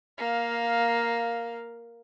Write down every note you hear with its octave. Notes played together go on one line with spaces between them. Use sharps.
A#3 F5